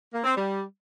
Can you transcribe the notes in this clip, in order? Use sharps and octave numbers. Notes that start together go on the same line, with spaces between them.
A#3
C4
G3